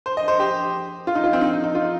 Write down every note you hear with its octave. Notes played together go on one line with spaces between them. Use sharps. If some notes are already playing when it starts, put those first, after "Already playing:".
C5
D#5
C5
G4
F4
D#4
F4
C4
D#4
D#4
D#4
F4